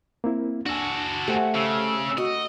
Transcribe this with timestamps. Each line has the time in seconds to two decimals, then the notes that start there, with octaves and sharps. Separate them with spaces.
0.24 A#3 C4 E4
0.66 D4 F#4 A4 G#5
1.28 A3 G4 C5 F#5 G#5
1.55 C#3 E6
2.18 F#4 D#5